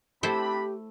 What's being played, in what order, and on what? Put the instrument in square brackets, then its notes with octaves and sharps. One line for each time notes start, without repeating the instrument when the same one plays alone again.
[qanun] A3 [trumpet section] C4 D4 B5 [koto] E4 A4 C5 [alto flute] G4